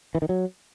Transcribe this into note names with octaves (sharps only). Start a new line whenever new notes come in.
E3
D#3
F#3